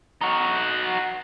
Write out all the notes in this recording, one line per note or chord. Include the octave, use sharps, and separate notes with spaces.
D#4 F#4